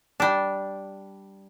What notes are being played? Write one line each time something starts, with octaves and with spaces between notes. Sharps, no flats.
G3 D4